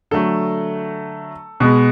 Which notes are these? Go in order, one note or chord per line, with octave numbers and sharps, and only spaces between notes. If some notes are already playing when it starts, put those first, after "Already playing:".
D3 F#3 A3 A4
B2 G#3 B3